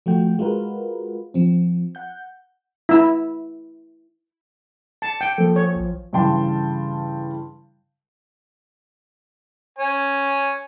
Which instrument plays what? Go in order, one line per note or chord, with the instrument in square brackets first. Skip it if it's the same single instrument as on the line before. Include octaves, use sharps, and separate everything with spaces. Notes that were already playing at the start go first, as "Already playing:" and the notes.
[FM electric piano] F3 A3 F#4 G5
G#3 F4 F#4 A#4 B4
F3 C4
F#5 G6
[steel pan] E4 E6
[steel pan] A5 [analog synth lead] C#7
[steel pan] G5
[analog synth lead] F3 [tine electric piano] A#3 A4
[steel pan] C#5
[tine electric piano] A1
[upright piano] G2 C#3 E3 G5 A5 C6
[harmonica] C#5 G#5